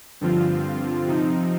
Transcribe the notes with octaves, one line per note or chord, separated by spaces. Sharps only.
G2 D3 F3 C4 F4
C3 F3 C4 D#4